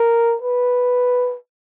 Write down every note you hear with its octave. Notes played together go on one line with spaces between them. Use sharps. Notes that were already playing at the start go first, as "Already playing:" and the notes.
Already playing: A#4
B4